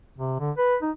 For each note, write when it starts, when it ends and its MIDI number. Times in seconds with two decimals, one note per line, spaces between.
0.18 0.37 48
0.40 0.51 50
0.57 0.76 71
0.82 0.91 63